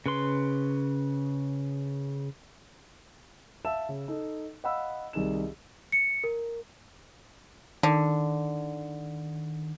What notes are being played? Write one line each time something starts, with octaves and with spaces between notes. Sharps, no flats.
C#3 B4 C6
E5 F5 A5 E6 E7
C#3
D#4 A4
D#5 F5 F#5 B5 E6
C2 D#3 D#4 G#4 E7
C#7
A#4
D3 D#3